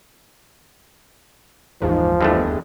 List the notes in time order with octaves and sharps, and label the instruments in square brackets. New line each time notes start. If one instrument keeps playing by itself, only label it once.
[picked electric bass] F#1 D#2 E3 [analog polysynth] G#2 [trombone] F3
[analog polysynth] E2 G#3 [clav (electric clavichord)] G2 D3 A3